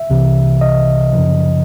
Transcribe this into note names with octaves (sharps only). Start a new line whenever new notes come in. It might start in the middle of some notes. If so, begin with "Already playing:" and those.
Already playing: E5
C2 C3 E3
D#5
F#2 C#3 F3